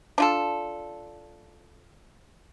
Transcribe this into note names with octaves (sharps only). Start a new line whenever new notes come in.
D4 F4 A4